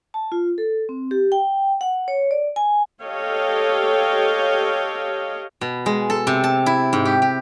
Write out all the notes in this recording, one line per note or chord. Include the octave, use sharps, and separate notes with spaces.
A5
F4
A4
C4
G4
G5
F#5
C#5
D5
G#5
G4 A4 C#5 D#5 F5 G5
B2
G#3
A4
C3
A5
E4
G#2
G4
G4